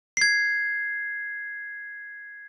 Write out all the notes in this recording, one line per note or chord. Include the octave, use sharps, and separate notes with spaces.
G#6 C7